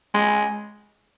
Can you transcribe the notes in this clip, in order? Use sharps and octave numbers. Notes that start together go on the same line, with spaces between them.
G#3